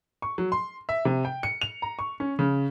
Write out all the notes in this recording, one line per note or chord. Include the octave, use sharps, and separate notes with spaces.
C#6
F#3
C6
E5
C3
G5
C#7
F7
A#5
C#6
C#4
C#3